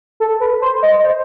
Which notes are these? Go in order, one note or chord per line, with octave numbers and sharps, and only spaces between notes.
A4
B4
C5
D#5
C5